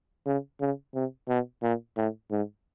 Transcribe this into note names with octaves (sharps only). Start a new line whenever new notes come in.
C#3
C#3
C3
B2
A#2
A2
G#2